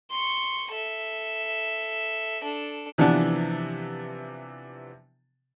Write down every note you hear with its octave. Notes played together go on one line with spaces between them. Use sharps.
C6 C#6
A4 E5
D4 A4
C3 E3 F3 B3 D4